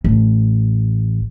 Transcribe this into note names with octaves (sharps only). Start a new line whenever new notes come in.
A1